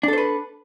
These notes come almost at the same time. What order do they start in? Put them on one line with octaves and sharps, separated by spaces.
D4 A4 C5 B4